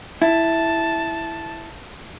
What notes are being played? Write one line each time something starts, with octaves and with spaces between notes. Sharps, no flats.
E4 A5